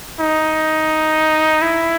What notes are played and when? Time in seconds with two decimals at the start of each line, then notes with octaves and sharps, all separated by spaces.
0.20 D#4
1.62 E4